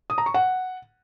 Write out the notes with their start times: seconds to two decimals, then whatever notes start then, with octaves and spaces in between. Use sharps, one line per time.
0.10 D#6
0.18 A#5
0.26 C#6
0.34 F#5